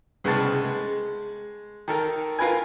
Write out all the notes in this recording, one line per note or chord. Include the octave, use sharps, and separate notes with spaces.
C2 C#3 G#3 B3 A5
G#3
D#3 A4 A#4
F4 A#4 B4 G#5